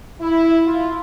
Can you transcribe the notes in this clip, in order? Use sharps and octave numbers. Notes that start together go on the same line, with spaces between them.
E4
F4